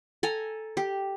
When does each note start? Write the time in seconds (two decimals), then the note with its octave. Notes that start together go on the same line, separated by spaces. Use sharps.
0.23 A4 G#5 A#5
0.77 G4